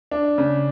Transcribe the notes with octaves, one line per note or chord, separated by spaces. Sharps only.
D4
C#3